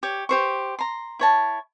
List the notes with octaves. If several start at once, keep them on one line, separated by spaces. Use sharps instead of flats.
G4 C#5
G4 C5 C#6
A#5 C6
E4 C#5 A5